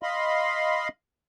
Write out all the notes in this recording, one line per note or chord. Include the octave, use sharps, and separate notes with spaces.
D#5 F5 B5 C6